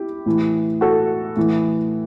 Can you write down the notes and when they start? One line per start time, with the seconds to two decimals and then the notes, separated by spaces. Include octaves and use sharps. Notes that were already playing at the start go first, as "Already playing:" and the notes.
Already playing: E4 G4
0.26 A2 E3
0.81 F#4 A4
1.37 A2 E3